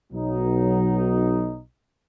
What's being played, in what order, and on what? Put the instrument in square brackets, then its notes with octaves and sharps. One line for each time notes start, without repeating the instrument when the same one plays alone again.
[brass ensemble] B1 F#3 D#4